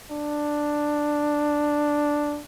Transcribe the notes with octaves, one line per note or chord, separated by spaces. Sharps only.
D4